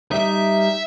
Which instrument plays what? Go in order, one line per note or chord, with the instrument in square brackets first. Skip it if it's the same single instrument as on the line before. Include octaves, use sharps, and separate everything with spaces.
[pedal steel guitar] G3 D#4 [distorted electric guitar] E5